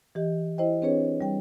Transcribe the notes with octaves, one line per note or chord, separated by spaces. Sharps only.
E3 G4 D#5
E4 C5 D#5 G5
C4 D4 G#4 B4 C#5
G3 G5